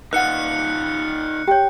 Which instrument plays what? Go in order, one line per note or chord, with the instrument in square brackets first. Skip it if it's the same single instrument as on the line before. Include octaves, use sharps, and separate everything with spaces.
[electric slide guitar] D#4 F4 [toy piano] B4 F#5 [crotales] F#6 C#7
[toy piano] G4 C#5 [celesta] G5